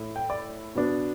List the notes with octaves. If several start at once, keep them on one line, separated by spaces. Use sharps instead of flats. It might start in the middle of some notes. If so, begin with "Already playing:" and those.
Already playing: A2 A3 E4
G5
D5
B2 B3 D4